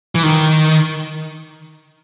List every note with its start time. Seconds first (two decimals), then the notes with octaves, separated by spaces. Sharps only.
0.15 E3
0.23 D#3